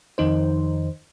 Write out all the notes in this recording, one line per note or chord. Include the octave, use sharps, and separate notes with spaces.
F2 D#3 D#4 C5